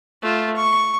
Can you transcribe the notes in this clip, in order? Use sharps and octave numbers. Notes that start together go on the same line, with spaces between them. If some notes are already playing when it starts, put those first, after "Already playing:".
A3 F4
C#6